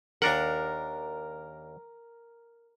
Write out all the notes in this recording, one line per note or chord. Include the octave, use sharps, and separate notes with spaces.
D#2 D4 A#4 F#5